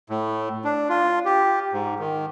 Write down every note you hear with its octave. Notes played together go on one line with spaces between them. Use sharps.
A2
D4
F4
G4
G#2
D#3